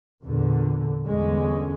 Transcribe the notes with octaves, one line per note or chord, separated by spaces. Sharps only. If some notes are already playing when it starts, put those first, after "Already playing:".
E2 A#2 D3
G1 E2 D3 G#3 C#4